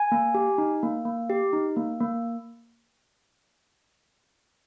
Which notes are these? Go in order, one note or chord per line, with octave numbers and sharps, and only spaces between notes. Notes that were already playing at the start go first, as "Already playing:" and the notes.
Already playing: G#5
A#3
G4
D#4
A#3
A#3
G4
D#4
A#3
A#3